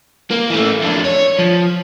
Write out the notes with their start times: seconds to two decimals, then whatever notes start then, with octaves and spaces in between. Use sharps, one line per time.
0.31 A#3
0.50 E3 A3
0.81 F2 D4
1.04 C#5
1.39 F3